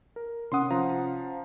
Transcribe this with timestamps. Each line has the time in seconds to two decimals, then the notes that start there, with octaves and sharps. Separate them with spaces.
0.16 A#4
0.52 C3 C#4 F#5 C6 D#6
0.71 F3 F5 A#5